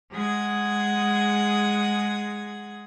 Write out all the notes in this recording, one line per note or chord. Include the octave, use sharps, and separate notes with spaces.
G#3 G#4 F#5 D#6 G#6